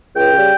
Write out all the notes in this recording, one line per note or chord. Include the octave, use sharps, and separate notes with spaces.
C#2 G5
C#3 G3